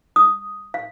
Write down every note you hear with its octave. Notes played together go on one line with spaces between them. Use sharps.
D#6
F5